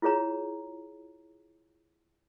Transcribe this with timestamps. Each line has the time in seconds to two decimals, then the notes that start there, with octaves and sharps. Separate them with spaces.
0.02 E4 F4 G#4 C#5 A#5